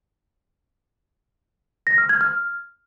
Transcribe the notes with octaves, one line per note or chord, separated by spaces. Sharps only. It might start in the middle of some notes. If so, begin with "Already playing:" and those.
A#6
F6
G#6
F6